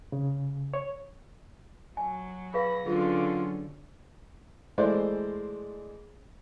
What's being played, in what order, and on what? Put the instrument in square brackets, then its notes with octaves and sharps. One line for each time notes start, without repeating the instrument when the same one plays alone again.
[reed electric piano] C#3
C#5
[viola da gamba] F#3 [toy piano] G#5
[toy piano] G#4 B4 F5 [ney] B5 [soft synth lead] A#6
[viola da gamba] D3 C#4 [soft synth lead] F#3 [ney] F4 [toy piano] G#4 A#4
[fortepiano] E3 G#3 A3 C5 D5